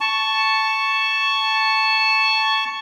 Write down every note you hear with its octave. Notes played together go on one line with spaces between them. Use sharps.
A5 C#6